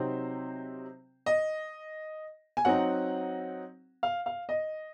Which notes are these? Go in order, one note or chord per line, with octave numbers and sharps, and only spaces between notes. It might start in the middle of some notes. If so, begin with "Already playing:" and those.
Already playing: C3 F#3 C4 D#4 C5
D#5
G#5
F#3 C4 D#4 F#5
F5
F5
D#5